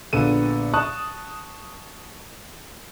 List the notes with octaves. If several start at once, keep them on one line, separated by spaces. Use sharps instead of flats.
A#1 A#2 D3 B3 A4 D#7
A5 C#6 D#6 F#6